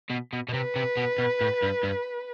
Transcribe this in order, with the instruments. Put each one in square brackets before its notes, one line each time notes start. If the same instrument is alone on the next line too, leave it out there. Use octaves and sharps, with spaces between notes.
[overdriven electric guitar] B2
B2
B2
[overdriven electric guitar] C3 [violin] B4
[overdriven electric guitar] C3
B2
B2
A2
G2
G2